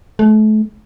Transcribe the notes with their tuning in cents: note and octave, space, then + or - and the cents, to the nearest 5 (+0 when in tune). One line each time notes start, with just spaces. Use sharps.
A3 -35